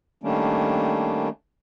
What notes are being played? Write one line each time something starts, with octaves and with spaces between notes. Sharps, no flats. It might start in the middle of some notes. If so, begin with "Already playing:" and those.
D#3 G3 A3 A#3 C#4 D4